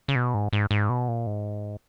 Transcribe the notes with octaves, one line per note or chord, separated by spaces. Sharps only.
C#3
B2
G#2
G#2
G#2
B2
A#2
G#2